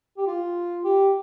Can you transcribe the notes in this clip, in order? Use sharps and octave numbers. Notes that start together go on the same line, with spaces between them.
G4
F4
G4